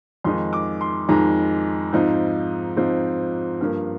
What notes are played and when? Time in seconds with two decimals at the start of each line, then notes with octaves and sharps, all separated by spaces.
0.24 F2 D#3 G#3 D#4 C6
0.53 D6
0.81 C6
1.08 F2 D#3 G#3 D#4 A#5
1.92 G#2 F3 C4 D#4
2.77 G#2 F3 C4 D#4
3.61 G2 F3 A#3